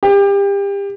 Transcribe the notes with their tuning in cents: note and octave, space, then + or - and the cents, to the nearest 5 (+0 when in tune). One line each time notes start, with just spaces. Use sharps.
G4 +30